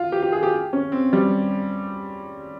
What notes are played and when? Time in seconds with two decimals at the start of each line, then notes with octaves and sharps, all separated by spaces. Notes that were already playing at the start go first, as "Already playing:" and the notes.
Already playing: F4
0.12 G4
0.22 G4
0.32 G#4
0.43 G4
0.73 C#4
0.92 C4
1.13 G3